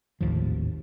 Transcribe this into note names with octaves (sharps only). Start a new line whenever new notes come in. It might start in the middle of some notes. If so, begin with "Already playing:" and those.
G#1 D#2 A2 F3